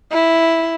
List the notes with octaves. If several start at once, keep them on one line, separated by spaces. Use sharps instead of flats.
E4